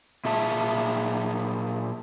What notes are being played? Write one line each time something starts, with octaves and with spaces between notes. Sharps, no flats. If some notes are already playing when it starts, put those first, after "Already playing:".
A#2 G#4 E5 A5